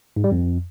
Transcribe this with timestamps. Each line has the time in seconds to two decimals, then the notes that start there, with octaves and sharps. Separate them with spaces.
0.16 G#2
0.24 G3
0.32 F2